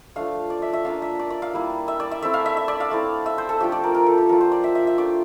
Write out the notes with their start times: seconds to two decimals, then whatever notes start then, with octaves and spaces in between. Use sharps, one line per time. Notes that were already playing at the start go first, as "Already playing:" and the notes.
0.16 F3 A3 D4 F5
0.50 D5
0.62 E5
0.73 E5
0.85 A#3 D4 F4 F5
1.02 E5
1.19 D5
1.30 D5
1.42 F5
1.53 G3 A#3 E4
1.88 E5
2.00 D5
2.11 E5
2.22 A3 C4 E4 E5
2.34 F5
2.46 E5
2.57 E5
2.68 D5
2.80 F5
2.91 A3 C4 E4
3.26 E5
3.38 C5
3.49 A4
3.60 F3 A3 D4 F4 G4
3.72 D5
3.84 A#4
3.94 A#4
4.06 A4
4.18 G4
4.29 F3 A#3 F4 A#4
4.41 C5
4.52 D5
4.64 E5
4.75 E5
4.87 E5
4.98 A3 D4 F4 D5